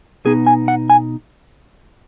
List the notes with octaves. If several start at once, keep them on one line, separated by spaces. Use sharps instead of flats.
B2 B3 D#4 G#4
G#5
F#5
G#5